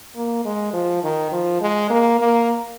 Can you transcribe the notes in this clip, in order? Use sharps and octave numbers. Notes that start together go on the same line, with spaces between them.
A#3
G#3
F3
D#3
F3
G#3
A#3
A#3